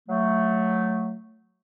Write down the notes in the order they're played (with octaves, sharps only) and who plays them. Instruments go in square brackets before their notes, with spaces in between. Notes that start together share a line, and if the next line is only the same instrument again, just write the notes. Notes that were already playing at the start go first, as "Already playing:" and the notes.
[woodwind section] F#3 A3